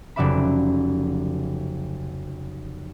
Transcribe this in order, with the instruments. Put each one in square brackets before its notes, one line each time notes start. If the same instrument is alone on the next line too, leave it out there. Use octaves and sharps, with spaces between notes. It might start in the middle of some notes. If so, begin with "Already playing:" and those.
[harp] F1 C#3 F#3 D5 E5 B5